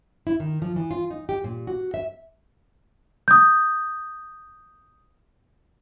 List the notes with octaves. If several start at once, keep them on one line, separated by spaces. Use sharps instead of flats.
E4
D#3
F3
E3
F4
D#4
G4
A#2
F#4
E5
D#6 G6